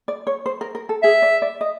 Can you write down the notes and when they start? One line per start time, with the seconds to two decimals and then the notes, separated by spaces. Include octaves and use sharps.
0.08 D5
0.27 C#5
0.46 C5
0.61 A#4
0.75 A#4
0.89 A4
1.03 G#4 E5
1.22 D5
1.42 D5
1.61 D#5